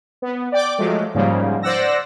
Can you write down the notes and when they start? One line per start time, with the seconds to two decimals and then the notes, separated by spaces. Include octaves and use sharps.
0.22 B3
0.52 D5 G5 D6
0.78 F3 F#3 G#3 A3
1.15 G#2 C#3 F3 G3 A#3
1.62 C5 D5 F#5 E6 A#6